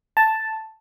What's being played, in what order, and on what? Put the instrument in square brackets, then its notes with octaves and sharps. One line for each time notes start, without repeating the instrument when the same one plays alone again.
[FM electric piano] A5